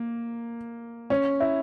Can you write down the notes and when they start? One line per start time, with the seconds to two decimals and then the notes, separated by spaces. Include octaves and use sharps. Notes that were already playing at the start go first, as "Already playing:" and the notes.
Already playing: A#3
1.10 C#4
1.40 E4